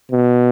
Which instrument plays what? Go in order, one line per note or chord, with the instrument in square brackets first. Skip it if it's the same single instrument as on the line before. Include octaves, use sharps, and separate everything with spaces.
[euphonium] B2